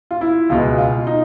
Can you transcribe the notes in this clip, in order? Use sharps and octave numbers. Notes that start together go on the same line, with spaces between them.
F4
E4
C#2 B2 G#3 F4
F4
D#4